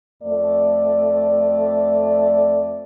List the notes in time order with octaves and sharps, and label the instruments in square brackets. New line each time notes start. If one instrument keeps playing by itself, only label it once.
[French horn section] F2 A3 D5